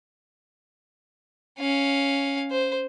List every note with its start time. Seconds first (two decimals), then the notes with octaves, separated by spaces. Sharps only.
1.59 C#4 F5
2.51 C5